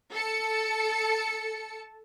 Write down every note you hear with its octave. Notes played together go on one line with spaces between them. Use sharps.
A4 A5 C#7